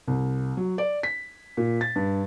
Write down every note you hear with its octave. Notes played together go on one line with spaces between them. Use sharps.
C2
F#3
D5
B6
A#2
A6
G2